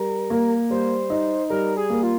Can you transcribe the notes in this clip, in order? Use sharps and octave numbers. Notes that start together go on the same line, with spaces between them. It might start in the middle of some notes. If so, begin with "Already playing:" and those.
Already playing: G3 A#4
A#3
G3 C5
D#4
G3 A#4
G#4
A#3
F4